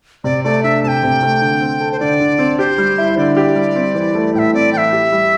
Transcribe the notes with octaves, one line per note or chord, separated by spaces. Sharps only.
C3 D5
A3 D5
D4 E5
C3 G5 A5
C3
A3
D3
C4
A4
C5
D3 D5
D3
C4
G4 C5
G3
E4
D3 D5
G4
G3
C4
E3
A3
A2 E5 G5
C4 D5
E3 E5 G5
G4
G3